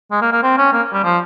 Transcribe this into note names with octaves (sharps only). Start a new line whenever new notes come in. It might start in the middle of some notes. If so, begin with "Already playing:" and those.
G#3
A#3
A#3
C4
C#4
A#3
G3
F3